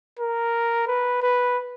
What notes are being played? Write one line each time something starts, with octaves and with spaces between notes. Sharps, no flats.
A#4
B4
B4